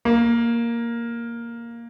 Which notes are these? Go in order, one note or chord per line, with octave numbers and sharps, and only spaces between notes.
A#3